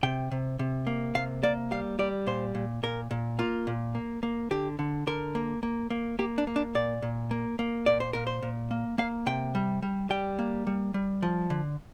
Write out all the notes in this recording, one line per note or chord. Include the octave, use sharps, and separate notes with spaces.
C3 G5
C3
C3
A#3
C3 F5
A#3 D5
G3 F5
G3 D5
A#2 C5
A#2
A#2 A#4
A#2
A#3 F4
A#2
A#3
A#3
D3 G4
D3
D3 A#4
A#3
A#3
A#3
A#3 G4
D4
A#3
D4
A#2 D5
A#2
A#3
A#3
A#2 D5
C5
A#2 A#4
C5
A#2
A#3
A#3 F5
C3 G5
G3
G3
G3 G5
A#3
G3
G3
F3
D3